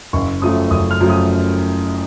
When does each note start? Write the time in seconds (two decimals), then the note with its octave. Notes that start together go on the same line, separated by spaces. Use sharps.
0.13 F#1 C#6
0.42 F#2 F3 A3 D#6
0.70 F#1 D#6
0.91 F6
1.00 F#2 F3 A3
1.10 D#6